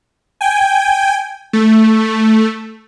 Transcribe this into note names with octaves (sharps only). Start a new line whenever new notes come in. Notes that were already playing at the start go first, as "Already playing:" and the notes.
G5 G#5
A3